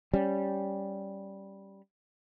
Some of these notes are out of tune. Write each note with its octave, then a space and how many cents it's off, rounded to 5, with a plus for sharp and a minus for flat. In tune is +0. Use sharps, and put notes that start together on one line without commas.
G3 -5 C#4 +0